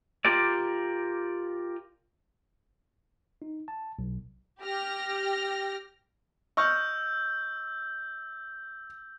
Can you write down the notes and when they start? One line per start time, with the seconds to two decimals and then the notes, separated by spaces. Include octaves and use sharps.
0.25 F4 G4 A#4 D5
3.42 D#4
3.68 A5
3.99 B1
4.60 G4 G5 F6 A#6
6.57 D#5 C#6 E6 F6 G6